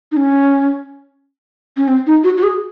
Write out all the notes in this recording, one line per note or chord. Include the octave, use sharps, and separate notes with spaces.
D#4
C#4
C#4
C4
D#4
F#4
F#4
G#4